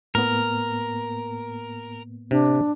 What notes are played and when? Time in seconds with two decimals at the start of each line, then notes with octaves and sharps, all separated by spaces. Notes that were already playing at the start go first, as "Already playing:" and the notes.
0.15 A2 A#3 B3 A#4
2.31 C3 D4